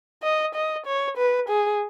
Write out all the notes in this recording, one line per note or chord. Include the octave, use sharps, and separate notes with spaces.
D#5
D#5
C#5
B4
G#4